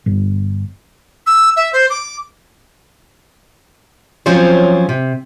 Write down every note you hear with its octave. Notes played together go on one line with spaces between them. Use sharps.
G1
E6
E5
C5
D6
F3 F#3 C4 C#4 F4 C5
C3